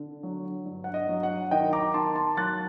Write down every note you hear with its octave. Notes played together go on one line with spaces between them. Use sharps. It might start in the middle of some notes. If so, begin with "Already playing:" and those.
Already playing: D3
F#3
G2
F#5
D#5
F#3
F#5
D#3 D#5 G5
A#5 D6
D#3 A5 C6
A5 C6
F#3 F#6 A6